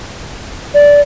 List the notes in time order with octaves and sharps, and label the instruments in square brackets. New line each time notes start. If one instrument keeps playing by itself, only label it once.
[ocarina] D5